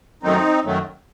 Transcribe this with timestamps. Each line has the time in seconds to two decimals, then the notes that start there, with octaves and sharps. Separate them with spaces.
0.23 F#2 D#3 F#3 A3 C4 D#4
0.64 F#2 D#3 F#3 A3